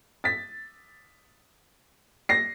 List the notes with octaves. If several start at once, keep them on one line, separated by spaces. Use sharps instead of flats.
A6 B6
A#6 C7